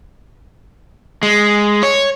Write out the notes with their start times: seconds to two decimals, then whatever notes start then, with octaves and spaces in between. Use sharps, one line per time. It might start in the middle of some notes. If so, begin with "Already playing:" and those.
1.23 G#3
1.83 C#5